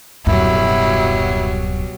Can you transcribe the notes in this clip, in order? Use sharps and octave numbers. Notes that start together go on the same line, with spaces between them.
D1 F#2 B2 F#3 G3 E4